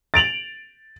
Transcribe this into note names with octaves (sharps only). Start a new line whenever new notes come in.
A6 D7 F7 F#7